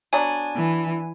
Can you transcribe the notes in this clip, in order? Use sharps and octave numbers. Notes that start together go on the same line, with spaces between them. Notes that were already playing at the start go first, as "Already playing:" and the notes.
F#3 B3 D4 G#5
E3